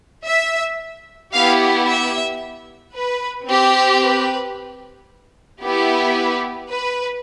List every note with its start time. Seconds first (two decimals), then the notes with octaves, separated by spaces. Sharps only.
0.25 E5
1.32 B3 E4 G4 F5
1.86 E5
2.93 B4
3.47 C4 G4
4.01 B4
5.62 B3 E4 G4
6.16 B4
6.69 B4